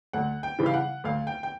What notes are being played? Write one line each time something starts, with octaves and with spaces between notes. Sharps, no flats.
D2 F#5
G5
C#3 E3 G3
F5
F#5
D2 F5
G5
G5